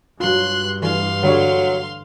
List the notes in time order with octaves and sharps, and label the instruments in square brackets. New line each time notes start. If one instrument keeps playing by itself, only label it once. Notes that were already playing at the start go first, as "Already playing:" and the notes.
[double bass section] G2 [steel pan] F#3 F4 [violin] C6 F#6
[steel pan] E3 [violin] F5 C6
[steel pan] D3 G3 C#5 [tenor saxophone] F#3